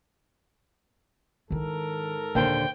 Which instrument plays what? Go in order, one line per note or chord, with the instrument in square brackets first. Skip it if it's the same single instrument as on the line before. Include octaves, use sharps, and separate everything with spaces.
[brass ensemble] G#2 A4 A#4 [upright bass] D#3 E4
[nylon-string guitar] D#2 D3 C5 [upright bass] A#2 [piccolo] G5